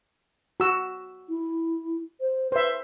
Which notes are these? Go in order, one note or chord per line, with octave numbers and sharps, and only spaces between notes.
F#4 E6
E4
C5
B4 C5 E5